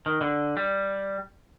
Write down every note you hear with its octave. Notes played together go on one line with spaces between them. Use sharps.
D#3
D3
G3